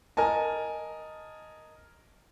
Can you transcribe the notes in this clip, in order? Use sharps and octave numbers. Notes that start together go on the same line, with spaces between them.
A#4 D#5 G#5 A5